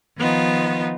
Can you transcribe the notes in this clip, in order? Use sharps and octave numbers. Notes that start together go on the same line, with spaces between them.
D#3 F3 B3 D#4 F4